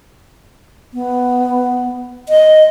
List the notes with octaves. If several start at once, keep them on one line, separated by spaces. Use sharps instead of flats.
B3
D#5